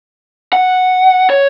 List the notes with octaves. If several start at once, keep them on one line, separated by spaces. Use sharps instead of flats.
F#5
C#5